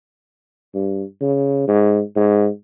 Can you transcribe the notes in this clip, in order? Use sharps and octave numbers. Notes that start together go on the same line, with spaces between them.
G2
C#3
G#2
G#2